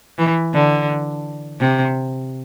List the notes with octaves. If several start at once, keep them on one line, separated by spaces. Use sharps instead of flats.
E3
D3
C3